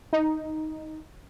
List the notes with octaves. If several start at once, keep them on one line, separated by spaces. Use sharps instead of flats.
D#4